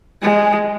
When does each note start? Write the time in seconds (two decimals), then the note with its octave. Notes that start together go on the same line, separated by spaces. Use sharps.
0.22 G#3